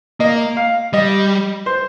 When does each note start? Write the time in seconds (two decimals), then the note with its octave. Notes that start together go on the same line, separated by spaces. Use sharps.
0.20 A#3 D#5
0.57 F5
0.93 G3 D#5
1.66 C5